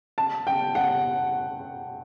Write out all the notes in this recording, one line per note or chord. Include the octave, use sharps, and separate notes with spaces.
A5
G5
F#5